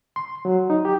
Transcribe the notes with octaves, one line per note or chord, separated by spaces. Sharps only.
C6
F#3
D#4
G4